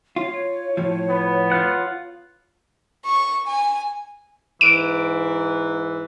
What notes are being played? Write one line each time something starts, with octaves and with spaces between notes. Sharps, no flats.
F4 C#5
A2 F3
B3
F4 F#5
C#6
G#5
G#2 E3 D7